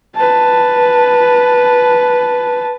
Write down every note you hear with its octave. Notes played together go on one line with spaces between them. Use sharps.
B4 A5